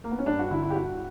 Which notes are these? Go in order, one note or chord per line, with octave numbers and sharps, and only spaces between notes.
A#3
B3
C#4
G2 D4
F#4
D3 E4
E4
G4
G2 F#4